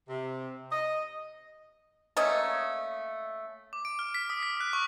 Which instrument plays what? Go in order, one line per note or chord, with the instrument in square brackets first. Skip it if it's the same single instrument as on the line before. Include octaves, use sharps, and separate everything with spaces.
[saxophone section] C3
D#5
[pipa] A3 A#3 C#4 D#5
[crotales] D6
D7
F6
B6
D#6
B6
F#6
C#6